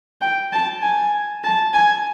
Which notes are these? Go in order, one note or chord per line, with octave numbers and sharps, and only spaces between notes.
G5
A5
G#5
A5
G#5